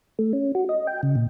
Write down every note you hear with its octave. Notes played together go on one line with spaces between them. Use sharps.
A3
C#4
F#4
D#5
G5
C#3
A#2